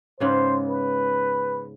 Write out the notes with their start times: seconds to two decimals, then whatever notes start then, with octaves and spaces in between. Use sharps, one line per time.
0.20 G#2 C#3 B3 C5
0.69 B4